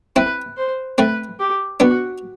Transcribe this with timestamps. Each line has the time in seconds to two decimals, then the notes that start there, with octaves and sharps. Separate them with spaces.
0.16 C4 E4 B4
0.57 C5
0.98 A3 C4 B4
1.39 G4
1.80 B3 D4 F#4